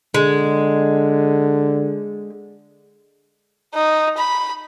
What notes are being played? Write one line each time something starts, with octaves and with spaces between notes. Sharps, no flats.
D3 G#3
D#4
B5